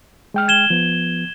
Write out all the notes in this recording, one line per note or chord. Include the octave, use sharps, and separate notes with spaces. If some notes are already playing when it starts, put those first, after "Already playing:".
G#3 G5 F6
G#6 E7 G7
F3 B3